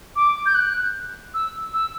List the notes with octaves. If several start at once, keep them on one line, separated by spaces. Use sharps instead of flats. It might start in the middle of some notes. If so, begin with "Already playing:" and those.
D6
G6
F#6
E6
E6